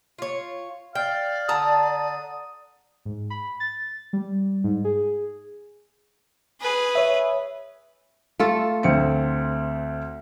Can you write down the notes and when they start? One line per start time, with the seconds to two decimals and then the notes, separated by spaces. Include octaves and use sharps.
0.18 F4 C#5
0.95 D5 F5 G5
1.49 D3 A5 A#5 D#6
3.05 G#2
3.30 B5
3.60 A6
4.13 G3
4.64 G#2
4.84 G#4
6.61 G#4 B4
6.95 C#5 E5
8.40 A3 F4 A4
8.83 D2 C4 C#7